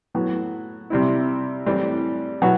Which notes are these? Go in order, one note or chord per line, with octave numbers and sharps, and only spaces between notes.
A2 F#3 B3
C3 G3 C4 E4
A2 E3 G3 C4
B2 F#3 B3 E4